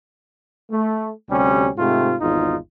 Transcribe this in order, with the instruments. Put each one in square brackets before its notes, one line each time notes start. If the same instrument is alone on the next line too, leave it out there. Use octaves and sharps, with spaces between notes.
[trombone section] A3
D2 C3 G3 C#4
G#2 C3 A3 F4
G#1 E2 D#4 F4